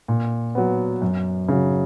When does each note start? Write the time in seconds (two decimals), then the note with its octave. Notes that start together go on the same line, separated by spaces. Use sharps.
0.08 A#2
0.55 F#3 B3
1.02 F#2
1.49 C#3 F#3